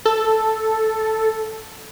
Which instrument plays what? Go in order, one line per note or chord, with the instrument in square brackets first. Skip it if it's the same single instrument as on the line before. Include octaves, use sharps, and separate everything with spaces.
[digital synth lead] A4